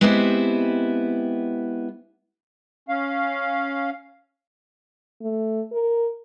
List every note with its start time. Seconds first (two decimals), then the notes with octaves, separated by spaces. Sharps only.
0.01 G#3 B3 C4 E4 G4 C5
2.89 C#4 F5
5.22 A3
5.72 A#4